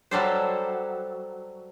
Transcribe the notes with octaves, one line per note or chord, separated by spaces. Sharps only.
F#3 G3 A4 C5